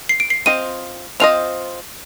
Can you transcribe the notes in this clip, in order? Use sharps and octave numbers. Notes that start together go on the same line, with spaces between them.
C7
D7
C7
C4 F4 C5 D#5 D#7
C4 F4 C5 D#5 F7